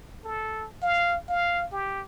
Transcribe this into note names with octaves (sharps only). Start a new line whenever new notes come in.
A4
F5
F5
G4